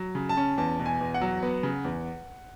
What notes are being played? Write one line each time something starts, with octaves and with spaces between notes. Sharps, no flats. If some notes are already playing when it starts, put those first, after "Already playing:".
Already playing: F#3
C#3
A5
C#4
E2 A5
B2
G#5
E2
F#5
F#3
B3
C#3
E2